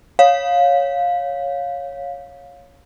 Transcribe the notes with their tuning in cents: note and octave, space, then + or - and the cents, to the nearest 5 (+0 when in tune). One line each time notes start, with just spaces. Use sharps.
C#5 +0 F5 +15